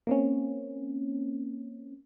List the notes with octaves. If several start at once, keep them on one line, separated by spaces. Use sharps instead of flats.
A#3 C4 C#4